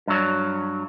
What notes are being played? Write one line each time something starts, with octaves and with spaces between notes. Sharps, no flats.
G2 F#3